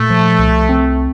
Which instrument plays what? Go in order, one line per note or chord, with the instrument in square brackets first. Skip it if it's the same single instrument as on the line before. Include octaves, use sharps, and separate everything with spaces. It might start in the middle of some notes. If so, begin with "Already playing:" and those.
Already playing: [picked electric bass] A#2 [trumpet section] A3
[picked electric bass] F3
C2
C4